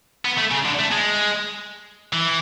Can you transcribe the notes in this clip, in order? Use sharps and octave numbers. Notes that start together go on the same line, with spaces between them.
B3
A3
C#3
D3
A3
G#3
E3